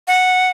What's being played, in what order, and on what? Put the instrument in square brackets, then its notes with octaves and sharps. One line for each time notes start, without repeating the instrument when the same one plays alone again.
[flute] F#5